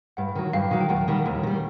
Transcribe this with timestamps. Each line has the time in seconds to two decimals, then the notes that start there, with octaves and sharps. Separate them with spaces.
0.17 G2 F#5
0.35 D#3 F#3
0.53 G2 F5 G5
0.71 D#3 F#3
0.81 G5
0.89 D#2 F#5
1.08 D#3 G3
1.26 D#2
1.43 D#3 G3